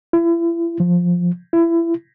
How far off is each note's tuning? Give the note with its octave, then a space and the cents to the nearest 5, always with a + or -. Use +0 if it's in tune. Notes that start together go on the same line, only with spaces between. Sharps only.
E4 +35
F3 +10
E4 +25